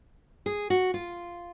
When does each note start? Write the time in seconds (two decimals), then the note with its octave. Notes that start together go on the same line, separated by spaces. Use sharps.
0.46 G#4
0.70 F#4
0.94 F4